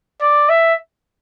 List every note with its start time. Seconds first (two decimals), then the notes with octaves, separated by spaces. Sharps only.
0.22 D5
0.49 E5